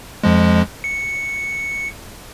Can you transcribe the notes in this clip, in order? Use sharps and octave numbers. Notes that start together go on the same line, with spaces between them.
F2 F3 G#3
C#7